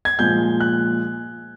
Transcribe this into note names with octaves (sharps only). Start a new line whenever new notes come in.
G#6
A#2 F3 G#3 G6
F#6